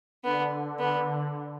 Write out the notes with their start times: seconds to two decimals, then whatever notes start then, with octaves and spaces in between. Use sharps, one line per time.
0.24 D3 B3
0.79 B3